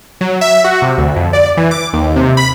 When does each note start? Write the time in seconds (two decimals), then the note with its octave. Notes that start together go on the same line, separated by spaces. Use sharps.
0.21 F#3
0.41 E5
0.64 F#4
0.82 C3
0.97 D2
1.16 F2
1.33 D5
1.57 E3
1.71 D6
1.93 D#2
2.16 C3
2.37 B5